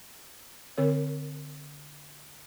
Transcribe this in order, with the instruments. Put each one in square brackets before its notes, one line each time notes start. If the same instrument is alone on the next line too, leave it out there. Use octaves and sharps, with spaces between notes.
[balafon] D3 C4 A#4 C#5